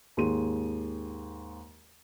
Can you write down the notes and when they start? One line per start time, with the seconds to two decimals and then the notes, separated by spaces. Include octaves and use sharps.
0.17 D#2 G#2 G#4 C6 D#7